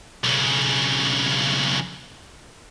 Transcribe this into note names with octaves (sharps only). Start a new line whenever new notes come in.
B1 C#3